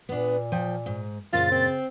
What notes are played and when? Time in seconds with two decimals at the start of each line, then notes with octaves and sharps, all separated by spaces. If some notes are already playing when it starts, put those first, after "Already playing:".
0.09 A#2 B3 D4
0.52 F3 G5
0.86 G#2
1.33 F#2 A#2 C#3 F4 C5 A6
1.51 C4